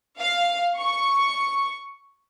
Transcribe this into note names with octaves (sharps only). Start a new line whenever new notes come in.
F5
C#6